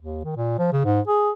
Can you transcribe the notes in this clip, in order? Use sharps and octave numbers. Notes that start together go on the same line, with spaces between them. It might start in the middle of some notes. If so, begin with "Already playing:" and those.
D#2
D#3
A#2
F3
C#3
G#2
G#4